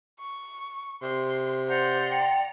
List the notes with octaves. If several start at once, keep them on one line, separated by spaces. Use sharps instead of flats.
C#6
C3 C6
C5 D5 F#5 A#5 C6 G6
G5